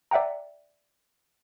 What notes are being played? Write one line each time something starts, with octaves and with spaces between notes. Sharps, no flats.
D5 E5 F#5 G5 A#5